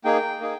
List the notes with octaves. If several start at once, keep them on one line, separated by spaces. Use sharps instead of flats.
A#3 D#4 G#4 G5
A#3 D#4 G#4